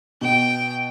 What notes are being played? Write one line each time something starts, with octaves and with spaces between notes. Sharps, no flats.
B2 G5